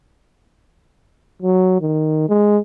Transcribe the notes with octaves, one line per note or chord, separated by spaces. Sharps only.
F#3
D#3
G#3